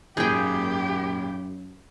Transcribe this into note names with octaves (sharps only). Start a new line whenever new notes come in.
G#1 F#2 A#2 G4 G#4 G5 G6